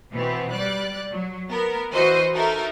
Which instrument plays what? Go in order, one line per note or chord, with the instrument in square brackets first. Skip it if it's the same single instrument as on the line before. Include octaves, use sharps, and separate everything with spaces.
[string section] B2 E3 B3 C4
G3 D5 F#6
F#3
B3 A#4
E3 F#4 C5 D#5
D#4 F#4 A4 A#4 E5